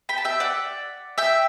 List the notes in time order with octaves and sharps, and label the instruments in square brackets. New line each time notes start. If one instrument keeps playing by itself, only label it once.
[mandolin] G5 B5
A5
E5 G5
D5 F#5
E5 G5